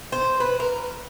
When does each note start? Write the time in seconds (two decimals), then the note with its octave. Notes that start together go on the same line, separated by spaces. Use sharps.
0.12 C5
0.40 B4
0.60 A#4